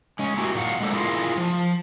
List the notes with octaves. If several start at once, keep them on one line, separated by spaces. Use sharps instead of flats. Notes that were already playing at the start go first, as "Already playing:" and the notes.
G#3 C#4
A#3 E4 F#4 G4
A#2 F#3 F4 F5 F#5
G#3 A#3 D4 A4 C5
E4 F4 G#4 A#4 F5
F3